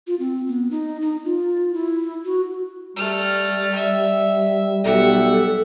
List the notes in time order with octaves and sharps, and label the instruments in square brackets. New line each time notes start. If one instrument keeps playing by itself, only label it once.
[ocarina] F4
C4
B3
D#4
D#4
F4
E4
F#4
[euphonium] G3 [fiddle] A3 F6
[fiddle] E5
[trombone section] B1 G4 [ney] A4 [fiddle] E5 F#5